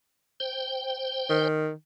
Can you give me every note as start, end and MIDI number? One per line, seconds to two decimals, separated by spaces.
0.40 1.48 72
0.40 1.48 79
1.29 1.71 51